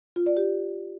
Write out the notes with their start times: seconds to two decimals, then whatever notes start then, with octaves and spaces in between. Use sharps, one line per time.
0.16 F4
0.26 D5
0.37 G4